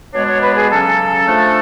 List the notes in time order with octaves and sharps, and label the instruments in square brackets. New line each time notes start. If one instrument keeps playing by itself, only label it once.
[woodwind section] B2 G#3 B3 D4 C#5
C#5
B4
G#4
C#3 F#3 C#4 A4
F3 A3 D4